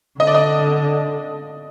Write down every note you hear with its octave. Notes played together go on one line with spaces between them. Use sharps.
D3 D#5
D5
D#5